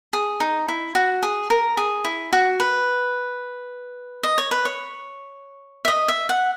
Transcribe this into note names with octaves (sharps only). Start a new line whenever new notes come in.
G#4
D#4
E4
F#4
G#4
A#4
G#4
E4
F#4
B4
D#5
C#5
B4
C#5
E5
D#5
E5
F#5